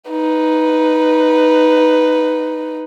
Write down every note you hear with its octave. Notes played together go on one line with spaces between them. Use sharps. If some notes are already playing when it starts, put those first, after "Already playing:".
D#4 B4